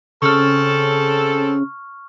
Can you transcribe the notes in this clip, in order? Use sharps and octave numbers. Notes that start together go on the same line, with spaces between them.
C#3 C4 C#4 A4 C#6 F6